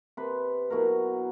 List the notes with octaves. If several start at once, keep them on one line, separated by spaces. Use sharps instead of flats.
C3 B4
B2 F#3 E4 A#4